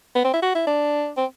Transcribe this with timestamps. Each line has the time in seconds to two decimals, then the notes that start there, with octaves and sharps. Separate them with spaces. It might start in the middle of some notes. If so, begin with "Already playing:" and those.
0.15 B3
0.25 C4
0.34 E4
0.42 F#4
0.55 E4
0.67 D4
1.17 C4